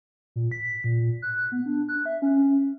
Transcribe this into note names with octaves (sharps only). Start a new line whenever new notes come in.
A#2
B6
A#2
F#6
B3
D4
F#6
E5
C#4